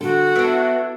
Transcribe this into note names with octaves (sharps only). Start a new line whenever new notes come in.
D3 F#4 A4
B3 D4 E4